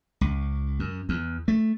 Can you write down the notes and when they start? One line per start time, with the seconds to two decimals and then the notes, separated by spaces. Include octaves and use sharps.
0.21 C#2
0.79 F#2
1.09 E2
1.48 A3